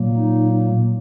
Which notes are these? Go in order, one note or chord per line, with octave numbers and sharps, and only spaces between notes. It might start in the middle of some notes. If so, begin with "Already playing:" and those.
Already playing: A#2 F#3 A#3
D#4